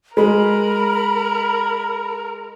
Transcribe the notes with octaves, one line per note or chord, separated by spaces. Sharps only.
G#3 A#4 B5